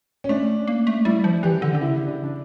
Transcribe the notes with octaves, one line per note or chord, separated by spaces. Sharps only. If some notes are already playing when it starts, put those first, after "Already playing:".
C#4
A3 D4
A#3
A3
G3 E4
F3
E3 G4
D3
D3 D4
C#3 E4
D4
D4